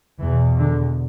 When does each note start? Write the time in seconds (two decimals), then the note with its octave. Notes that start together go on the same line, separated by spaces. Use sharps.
0.19 E2 B2 E3
0.58 D3